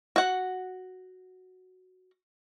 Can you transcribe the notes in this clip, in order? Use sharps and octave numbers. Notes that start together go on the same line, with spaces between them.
F#4 F#5